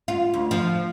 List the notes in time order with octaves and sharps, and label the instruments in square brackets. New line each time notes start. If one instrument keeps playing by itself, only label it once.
[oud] F4
D2
F3